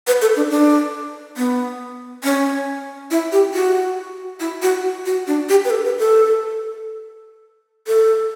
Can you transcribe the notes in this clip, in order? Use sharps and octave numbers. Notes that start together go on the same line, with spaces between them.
B4
A4
D4
D4
B3
C#4
E4
G4
F#4
E4
F#4
F#4
D4
G4
B4
A4
B4
A4
A4